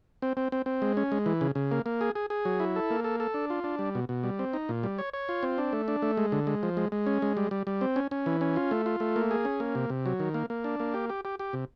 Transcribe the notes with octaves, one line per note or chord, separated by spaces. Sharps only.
C4
C4
C4
C4
G#3
C#4
G#3
E3
C#3
C#3
A#3
A#3
G#4
G#4
G#4
F#3
E4
A4
A#3
A4
A4
D4
F4
D4
G3
B2
B2
G3
C4
D#4
A#2
G3
C#5
C#5
F4
C4
D4
A3
D4
A3
G#3
D3
G#3
F3
G#3
G#3
C#4
G#3
G3
G3
G3
C4
C#4
C#4
E3
C#4
F4
A3
F4
A3
A#3
G#4
C#4
A#3
C3
C3
F#3
D#3
A#3
A#3
D4
A#3
G4
G4
G4
G4
C3